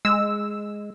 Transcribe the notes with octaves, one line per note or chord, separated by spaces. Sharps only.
G#3 E6